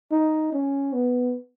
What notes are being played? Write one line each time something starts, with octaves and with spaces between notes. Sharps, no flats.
D#4
C#4
B3